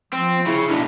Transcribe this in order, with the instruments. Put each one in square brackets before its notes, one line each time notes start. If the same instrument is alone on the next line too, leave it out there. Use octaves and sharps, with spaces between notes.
[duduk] F3 [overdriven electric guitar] C4
[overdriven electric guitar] C#3 [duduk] E4
[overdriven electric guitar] B1 A2 [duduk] D4